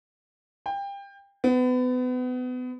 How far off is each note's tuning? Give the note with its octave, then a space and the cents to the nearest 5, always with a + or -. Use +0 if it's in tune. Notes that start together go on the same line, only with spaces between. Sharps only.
G5 +25
B3 +30